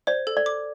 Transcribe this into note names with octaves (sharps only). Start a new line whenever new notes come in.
C5 D5
A4
D5
D6